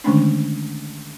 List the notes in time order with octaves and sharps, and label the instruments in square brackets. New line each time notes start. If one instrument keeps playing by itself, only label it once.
[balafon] D3 D#3 G#3 A3 C#4 D4